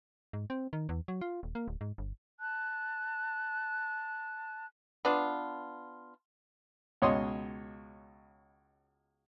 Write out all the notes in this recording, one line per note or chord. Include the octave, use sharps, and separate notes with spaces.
G#2
C4
D#3
E2
F#3
F4
D#1
A#3
D1
G#2
G1
A5 F#6
B3 D4 F4
C#2 B2 C#5 D#5 C6 D#6